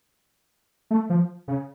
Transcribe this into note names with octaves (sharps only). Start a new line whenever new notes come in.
A3
F3
C#3